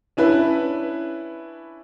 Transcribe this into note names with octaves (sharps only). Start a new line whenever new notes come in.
C#4 D4 E4 B4